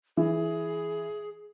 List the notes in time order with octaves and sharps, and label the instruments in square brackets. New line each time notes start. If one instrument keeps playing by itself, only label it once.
[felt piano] E3 [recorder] G#4